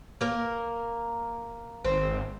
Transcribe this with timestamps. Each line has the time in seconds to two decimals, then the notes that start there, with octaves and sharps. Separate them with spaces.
0.21 A#3 A#4
1.85 G#1 C4